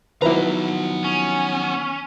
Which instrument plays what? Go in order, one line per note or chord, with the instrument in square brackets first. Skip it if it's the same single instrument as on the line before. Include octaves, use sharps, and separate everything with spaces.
[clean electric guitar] D#3 F3 F#3 [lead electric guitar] B3 A#5 [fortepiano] E4 B4
[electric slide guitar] C#4